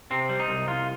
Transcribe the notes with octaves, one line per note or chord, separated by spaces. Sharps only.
C3 C4
G3
D#4
C2
C2 F4